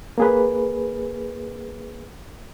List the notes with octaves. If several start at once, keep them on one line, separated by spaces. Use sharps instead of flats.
A#3 G#4 B4